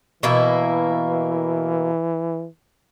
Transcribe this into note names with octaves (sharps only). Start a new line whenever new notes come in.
B2 E3 A#3 E4